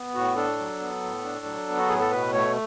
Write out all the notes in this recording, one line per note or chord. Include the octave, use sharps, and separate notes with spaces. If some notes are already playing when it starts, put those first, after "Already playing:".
Already playing: B3
A2 F#4
D4 A4
F#3
B3
A2
D4
F#3
B3
F#4
A2 G#4
A4
B2 B4
A3 C#5